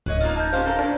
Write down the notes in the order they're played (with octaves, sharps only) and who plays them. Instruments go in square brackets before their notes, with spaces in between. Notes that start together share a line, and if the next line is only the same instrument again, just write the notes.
[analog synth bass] D1 [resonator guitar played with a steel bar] B4 C#5 D#5
[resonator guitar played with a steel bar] A#3 D#4 F4
[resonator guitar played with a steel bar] D#4 [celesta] A5 G6
[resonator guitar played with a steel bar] C#4 F4 G4 [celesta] C5 F5
[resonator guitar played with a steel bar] A4 A#4
[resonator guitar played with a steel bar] A2 B4 [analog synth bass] D4